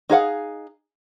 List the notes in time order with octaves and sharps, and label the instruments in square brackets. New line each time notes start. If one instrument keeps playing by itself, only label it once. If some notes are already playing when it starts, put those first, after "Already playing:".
[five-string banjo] D#4 G#4 F5 F#5